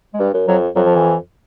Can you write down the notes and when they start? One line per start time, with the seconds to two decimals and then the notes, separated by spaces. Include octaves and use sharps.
0.14 G#3
0.19 G2 G3
0.34 F#2
0.48 F2 F#3
0.76 F2 F#3
0.86 F3
0.95 E3